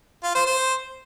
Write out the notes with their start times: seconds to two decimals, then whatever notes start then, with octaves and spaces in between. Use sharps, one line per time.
0.24 F4
0.35 C5
0.46 C5